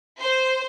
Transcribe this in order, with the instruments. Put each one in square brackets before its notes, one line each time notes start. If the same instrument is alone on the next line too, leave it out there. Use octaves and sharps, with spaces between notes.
[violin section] C5